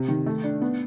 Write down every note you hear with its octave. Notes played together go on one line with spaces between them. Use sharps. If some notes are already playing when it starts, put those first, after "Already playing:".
Already playing: C3
D#3
A3
D4
B3